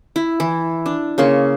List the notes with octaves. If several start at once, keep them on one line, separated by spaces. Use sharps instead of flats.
E4
E3
D4
C#3 A#3 C6 C#6